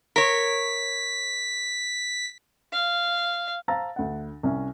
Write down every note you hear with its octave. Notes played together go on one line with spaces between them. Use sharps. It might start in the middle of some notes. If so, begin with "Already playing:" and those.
A#4 C#5 B6
F5
C5 F5 A5 A#5 E6 A6
D2 F#5
C2 C#4